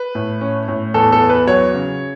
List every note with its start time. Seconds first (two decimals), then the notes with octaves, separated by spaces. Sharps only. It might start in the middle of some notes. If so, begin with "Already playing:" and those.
Already playing: B4
0.15 A2
0.41 C#4
0.68 A2
0.94 E2 A4
1.12 A4
1.21 E2
1.29 B4
1.47 F#3 C#5
1.74 C#3